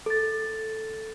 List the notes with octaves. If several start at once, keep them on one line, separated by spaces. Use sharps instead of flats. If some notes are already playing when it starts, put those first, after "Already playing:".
A4 A6